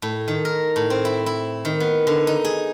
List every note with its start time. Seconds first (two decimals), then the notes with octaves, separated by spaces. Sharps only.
0.02 A2
0.28 D#3
0.45 A#4
0.76 A2
0.90 C4
1.05 E4
1.26 E4
1.65 D#3
1.80 B3
2.07 D3
2.27 D#4
2.45 G#4